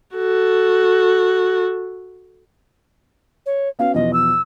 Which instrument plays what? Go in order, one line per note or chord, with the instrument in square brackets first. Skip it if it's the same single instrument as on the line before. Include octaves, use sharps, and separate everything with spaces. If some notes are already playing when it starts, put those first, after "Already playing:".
[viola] F#4 A4
[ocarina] C#5
[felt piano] B3 C#4 F#4 [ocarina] F5
[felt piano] E2 B2 F3 [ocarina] D#5
[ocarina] E6